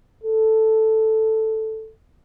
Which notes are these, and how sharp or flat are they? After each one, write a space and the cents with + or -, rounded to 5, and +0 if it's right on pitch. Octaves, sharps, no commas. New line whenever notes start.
A4 +0